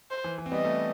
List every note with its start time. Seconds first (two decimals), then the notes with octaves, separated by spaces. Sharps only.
0.11 C5
0.24 E3
0.38 E3
0.46 C4
0.52 G3 B3 D#5
0.65 A3 C4